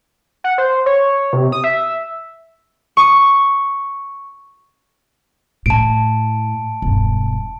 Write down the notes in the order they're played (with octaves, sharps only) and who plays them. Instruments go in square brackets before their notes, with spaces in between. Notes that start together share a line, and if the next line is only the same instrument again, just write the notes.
[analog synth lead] F#5
C5
C#5
C3
D#6
E5
[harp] C#6 D#6
[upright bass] A2 [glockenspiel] A5 D7
[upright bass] E1 G2